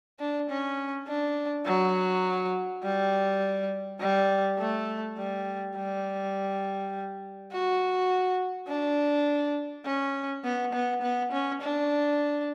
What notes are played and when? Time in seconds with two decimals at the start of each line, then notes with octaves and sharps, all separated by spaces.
0.19 D4
0.50 C#4
1.08 D4
1.66 F#3
2.84 G3
4.01 G3
4.59 A3
5.18 G3
5.77 G3
7.52 F#4
8.68 D4
9.86 C#4
10.44 B3
10.73 B3
11.02 B3
11.32 C#4
11.61 D4